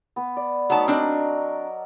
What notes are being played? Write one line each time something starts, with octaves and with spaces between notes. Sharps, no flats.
B3 B4
D5
F#3 A3 B3 D#4 A5
C4 D4 A#4 D5 D#5